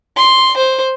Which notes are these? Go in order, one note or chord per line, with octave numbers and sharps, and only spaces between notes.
C6
C5